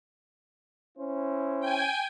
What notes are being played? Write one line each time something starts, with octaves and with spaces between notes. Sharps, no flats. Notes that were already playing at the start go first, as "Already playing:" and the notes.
C#4 E4 C5
G5 G#5